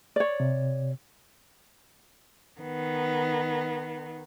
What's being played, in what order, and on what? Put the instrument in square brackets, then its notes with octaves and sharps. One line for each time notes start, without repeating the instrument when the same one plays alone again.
[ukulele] C#5 D5
[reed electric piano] C3
[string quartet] D#3 B3